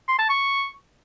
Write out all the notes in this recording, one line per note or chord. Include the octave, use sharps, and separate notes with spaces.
C6
A5
C#6